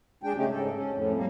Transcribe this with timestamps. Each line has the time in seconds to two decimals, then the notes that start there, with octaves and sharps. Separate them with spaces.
0.23 G#3 D4 G5
0.36 C#3 A3 C#4 D#4 G4
0.50 G#2 A4
0.74 C#4
0.92 F2 A2
1.16 G3 A#3